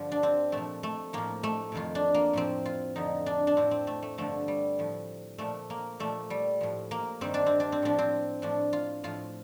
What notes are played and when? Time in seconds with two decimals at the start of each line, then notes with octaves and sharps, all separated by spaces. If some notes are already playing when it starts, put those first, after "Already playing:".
Already playing: G2 D3 F3
0.12 D4
0.23 C4
0.52 A#2 F3 A3
0.83 A3
1.13 A2 F3 A#3
1.43 A3
1.72 F2 C3 D#3 F4
1.95 D4
2.14 A#3
2.33 A2 F3 C4
2.65 F4
2.96 F2 D3 F3 D#4
3.26 D4
3.47 D4
3.57 A2 F3 C4
3.71 C4
3.87 A3
4.02 A3
4.18 G2 D3 F3 A3
4.48 G3
4.79 A2 F3
5.38 A#2 F3 A3
5.70 A#3
6.00 A#2 F3 A3
6.30 G3
6.61 A2 F3
6.91 A#3
7.21 G2 D#3 C4
7.34 D4
7.46 C4
7.60 D4
7.72 C4
7.82 A2 F3 D4
7.98 C4
8.42 A2 F3 D4
8.73 F4
9.04 A2 F3 F4